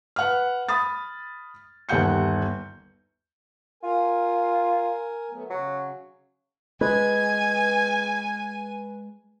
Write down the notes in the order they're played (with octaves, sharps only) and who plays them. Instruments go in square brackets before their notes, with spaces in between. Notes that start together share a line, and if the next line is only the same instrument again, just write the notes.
[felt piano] B4 F#5 F6
B5 D#6 A6
G1 D#2 G3 F#5 G6 C#7
[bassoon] F4 [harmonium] A#4 G#5
[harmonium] F#3 A3 B3
[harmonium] C#3 [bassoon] F#3
[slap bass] G#3 [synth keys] B4 [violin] G#5 [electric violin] G#6